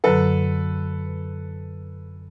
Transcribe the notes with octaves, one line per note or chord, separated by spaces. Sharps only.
F#2 D3 F#3 A4 B4